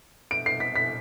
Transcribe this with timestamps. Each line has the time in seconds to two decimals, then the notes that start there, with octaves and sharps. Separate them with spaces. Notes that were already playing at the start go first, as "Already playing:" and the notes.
0.31 D7
0.46 C7
0.60 B6
0.76 B6